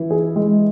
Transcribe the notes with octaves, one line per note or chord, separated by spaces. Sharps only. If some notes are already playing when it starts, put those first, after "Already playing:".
Already playing: E3 E4
G#4
G#3